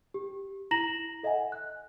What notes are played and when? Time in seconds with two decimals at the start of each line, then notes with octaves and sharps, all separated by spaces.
0.14 G4
0.71 E4 A#5 A#6 E7 F#7
1.23 A4 D#5 E5 F#5 G#5
1.52 F#6